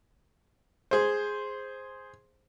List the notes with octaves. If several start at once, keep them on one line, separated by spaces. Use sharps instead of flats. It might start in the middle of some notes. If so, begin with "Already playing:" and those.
G#4 C5